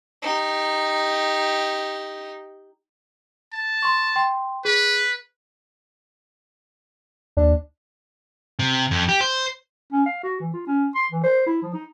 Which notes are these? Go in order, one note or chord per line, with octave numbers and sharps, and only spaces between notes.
D#4 G4
A5
C6 C#6
G5 C6
G#4 B4
D#2 D4
C3
F2
G4
C5
C#4
F5
F#4
E3
F4
C#4
C6
E3
C5
E4
F3
D#4